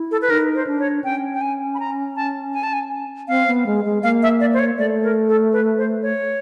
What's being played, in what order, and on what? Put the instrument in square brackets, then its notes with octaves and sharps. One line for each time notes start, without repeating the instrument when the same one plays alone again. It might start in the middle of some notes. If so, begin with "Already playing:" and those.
Already playing: [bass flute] E4
[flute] A4
B4
[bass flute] D#4 [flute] A#4
[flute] C5
[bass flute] D4
[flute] C#5
[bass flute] C#4 [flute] G5
[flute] G5
G#5
B5
A#5
A5
G#5
A5
G#5
[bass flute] C4 [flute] F5
[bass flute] B3
G#3
G#3
[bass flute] A#3 [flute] F5
[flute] E5
D5
C5
C#5
[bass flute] A3 [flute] D5
[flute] A#4
A4
B4
C5
C#5